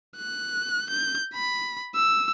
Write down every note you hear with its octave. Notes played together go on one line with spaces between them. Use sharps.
F#6
G6
B5
E6